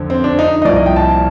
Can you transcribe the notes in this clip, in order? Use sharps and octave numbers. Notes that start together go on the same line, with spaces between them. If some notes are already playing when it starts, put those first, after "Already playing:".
Already playing: F2 D3 F3
C4
D4
D#4
D#5
C2 A#2 F3 D5
D#5
G5
A5